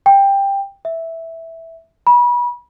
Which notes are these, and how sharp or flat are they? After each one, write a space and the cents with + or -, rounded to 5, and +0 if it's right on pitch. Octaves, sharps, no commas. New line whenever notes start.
G5 +15
E5 -5
B5 -30